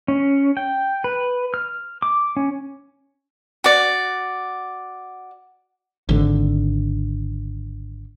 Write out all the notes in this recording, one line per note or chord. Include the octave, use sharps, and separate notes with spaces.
C#4
G5
B4
F6
D6
C#4
F#4 D5
G#1 D3